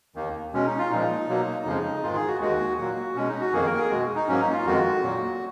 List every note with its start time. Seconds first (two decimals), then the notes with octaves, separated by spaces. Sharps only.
0.15 D#2 D#3 A#3
0.53 B2 G#3 C#4
0.66 D#4
0.79 F4
0.91 A#2 F3 G#3 D#4
1.29 B2 F#3 A#3
1.65 F2 C#3 F3 G#3
2.03 G#2 D#3 G#3 F4
2.16 G#4
2.28 F#4
2.40 D#2 D#3 G#3 F#4
2.77 A#2 F#3 A#3 F#4
3.15 B2 G#3 C#4
3.28 D#4
3.41 F#4
3.53 F2 D#3 A#3 G#4
3.66 A#4
3.78 G#4
3.90 B2 G#3 F#4
4.15 D#4
4.28 G#2 F#3 A#3 C#4
4.41 D#4
4.52 F4
4.65 F2 D#3 G#3 F#4
5.03 A#2 F#3 A#3